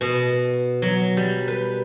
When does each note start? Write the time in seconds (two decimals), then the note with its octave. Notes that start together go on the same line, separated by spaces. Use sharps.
0.01 B2
0.82 F#3
1.17 G3
1.48 B4